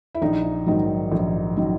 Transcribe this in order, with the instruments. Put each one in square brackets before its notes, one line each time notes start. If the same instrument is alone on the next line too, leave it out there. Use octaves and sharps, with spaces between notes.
[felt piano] E4
A#1 D#4
G#2 D#3 F#3
A#1
D#3 F#3